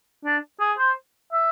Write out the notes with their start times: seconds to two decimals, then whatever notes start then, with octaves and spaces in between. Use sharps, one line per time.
0.25 D4
0.60 G#4
0.78 C5
1.32 E5